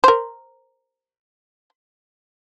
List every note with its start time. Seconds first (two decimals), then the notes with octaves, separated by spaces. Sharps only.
0.04 A#4 C5